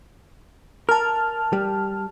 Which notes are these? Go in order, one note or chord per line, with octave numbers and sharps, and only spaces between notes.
A#4 A5 F6
G3